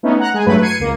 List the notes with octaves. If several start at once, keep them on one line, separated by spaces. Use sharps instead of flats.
A3 B3 C#4 D#4
F#5 A#5 F#6
G#3 G#4 G#5
G2 F#3 A3 E4 B4 B5
G#6 C7 C#7 D#7
C#2 A#3